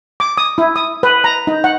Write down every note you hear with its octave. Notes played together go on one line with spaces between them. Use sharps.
D6
D#6
E4
D#6
B4
A#5
D#4
F#5